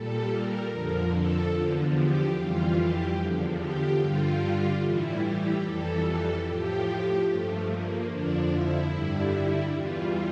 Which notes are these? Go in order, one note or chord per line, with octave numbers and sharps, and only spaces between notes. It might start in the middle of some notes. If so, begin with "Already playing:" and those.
Already playing: A#2 G3 A4
A#4
F2 D3 F3
A4
E2 D3 F3
G4
F2 E3 G3 F4
G4
E2 D3 F3
G4
G2 D3 G3 F4
A2 E3 G3 E4
G4
F2 E3 G3 A4
A2 F3 G4
G2 F3 A3
A#3
F2 D3 F3 D4
E4
G2 D3 G3
E2 E3 G3 F4